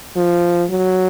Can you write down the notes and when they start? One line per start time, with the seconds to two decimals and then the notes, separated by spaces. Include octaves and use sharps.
0.16 F3
0.70 F#3